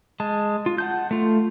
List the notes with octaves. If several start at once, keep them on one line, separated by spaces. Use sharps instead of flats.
G#3 A5
F4
F#5 A5 G6
A3 F4